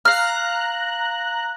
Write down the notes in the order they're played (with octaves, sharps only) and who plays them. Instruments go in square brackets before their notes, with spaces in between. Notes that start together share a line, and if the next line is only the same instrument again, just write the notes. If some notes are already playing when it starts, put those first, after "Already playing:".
[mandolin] F5 F6 [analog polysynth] A#5 F#6